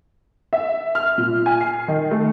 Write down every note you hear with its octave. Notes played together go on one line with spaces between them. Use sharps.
E5
F6
A#2
G#5
C7
D#3
A3